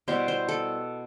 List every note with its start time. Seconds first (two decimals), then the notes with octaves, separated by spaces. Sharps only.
0.08 B2 G3 B3 E4 C5
0.28 C5
0.49 A4